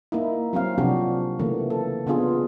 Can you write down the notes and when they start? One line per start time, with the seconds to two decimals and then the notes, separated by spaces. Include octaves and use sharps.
0.12 A#3 D#4 E4
0.53 F#3 C4 C#4 F5
0.78 C3 F3 F#3 D4 F#4 G4
1.39 C#3 E3 A3 A#3
1.70 A4
2.07 C#3 B3 D4 F4 G#4